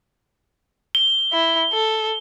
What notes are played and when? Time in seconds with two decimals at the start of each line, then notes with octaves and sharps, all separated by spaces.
0.95 G7
1.33 E4
1.73 A4